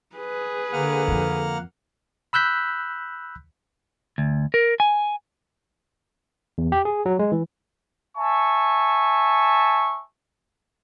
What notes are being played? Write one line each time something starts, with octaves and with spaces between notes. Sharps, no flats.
G#4 B4
D3 A#3 F#5 F6
F2 F3
B5 E6 F#6 G6 B6
D2
A#4
G#5
E2
G4
G#4
F#3
G#3
E3
E5 G#5 A5 C#6